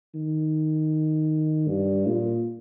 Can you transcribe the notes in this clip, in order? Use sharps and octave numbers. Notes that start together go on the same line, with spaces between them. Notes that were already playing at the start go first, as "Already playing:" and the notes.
D#3
G2
A#2